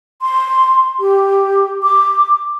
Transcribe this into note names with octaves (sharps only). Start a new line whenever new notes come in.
C6
G4
D6